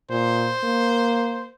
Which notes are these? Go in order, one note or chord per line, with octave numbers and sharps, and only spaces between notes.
A#2 C5
A#3